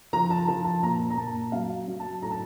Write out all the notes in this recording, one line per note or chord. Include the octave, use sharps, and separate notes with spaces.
F3 A#5
A5
F3 A5
A5
A#2 A#5
A#5
A#2 A5
F#3 F5
F#3
A5
A2 A#5
A5